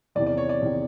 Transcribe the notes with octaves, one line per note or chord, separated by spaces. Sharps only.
E2 C3 D#3 D5
D5
C#5
D5
E2 C3 D#3